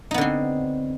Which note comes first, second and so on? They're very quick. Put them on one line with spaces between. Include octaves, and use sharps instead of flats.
D#4 B3 D3 C4